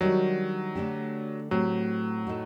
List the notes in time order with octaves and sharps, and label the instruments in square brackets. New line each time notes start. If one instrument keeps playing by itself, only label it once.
[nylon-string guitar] D#3 G3 D4 F#4 [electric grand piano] F#3
[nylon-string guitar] D3 A3 D4 G4
[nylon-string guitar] A2 A3 C4 G4 [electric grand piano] F#3
[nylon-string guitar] A2 A3 D#4 F#4